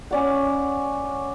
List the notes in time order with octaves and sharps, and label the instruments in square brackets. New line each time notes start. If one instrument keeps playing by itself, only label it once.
[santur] C#4 D5 F#5